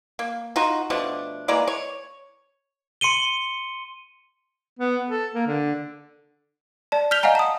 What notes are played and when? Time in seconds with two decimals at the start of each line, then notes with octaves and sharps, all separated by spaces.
0.19 A#3
0.56 D#4 F4 F#4
0.90 B2 F3 A3 D4
1.48 E3 G#3 A#3 D5
1.68 C#5
3.01 C6 C#7 D#7 G7
4.79 B3
5.09 A4
5.34 A#3
5.47 D3
6.92 D5 A5
7.11 F6 G6 B6 F7 G7
7.23 D#5 F5 F#5 G#5 A#5
7.35 A5 D#6